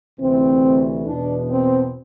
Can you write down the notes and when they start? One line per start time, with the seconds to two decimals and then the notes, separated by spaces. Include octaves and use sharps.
0.19 D2 C3 E3 C4
1.06 E2 B2 D4
1.50 C4